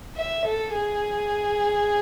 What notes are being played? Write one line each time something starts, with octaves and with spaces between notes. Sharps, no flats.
E5
A4
G#4